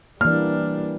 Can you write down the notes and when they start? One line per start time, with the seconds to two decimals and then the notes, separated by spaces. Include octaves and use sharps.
0.21 E3 G3 A#3 D4 F6